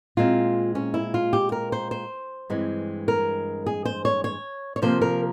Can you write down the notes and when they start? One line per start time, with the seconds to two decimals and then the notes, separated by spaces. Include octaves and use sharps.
0.17 A#2 G#3 C4 F4
0.75 C#4
0.94 E4
1.14 F4
1.33 G4
1.52 A#4
1.72 C5
1.91 C5
2.50 G2 E3 G#3 C4
3.08 A#4
3.66 G#4
3.85 C5
4.05 C#5
4.24 C#5
4.76 C#5
4.82 C3 F3 A#3 C5
5.01 A#4